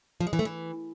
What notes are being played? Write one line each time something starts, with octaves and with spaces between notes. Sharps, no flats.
F3
G#3
E3
A3
E3